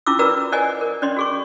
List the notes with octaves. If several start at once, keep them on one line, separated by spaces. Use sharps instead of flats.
C#4 E4 F4 D6 E6
F#4 A#4 B4 D5 A#5 E6
A#4 C5 D5 D#5 F#5 G#5
A#4
C#4 D5 D#5 C6
F#4 G#4 C#6